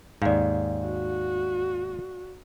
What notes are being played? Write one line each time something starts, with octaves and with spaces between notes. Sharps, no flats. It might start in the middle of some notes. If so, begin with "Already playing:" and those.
D#2 G#2 D5 F5
F#4